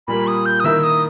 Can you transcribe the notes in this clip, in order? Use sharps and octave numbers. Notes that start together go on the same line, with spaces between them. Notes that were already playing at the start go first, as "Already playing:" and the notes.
A#2 G3 A#3 B5
D#6
G6
D#6
D#3 A#3 E4 A#4 E5 E6
D#6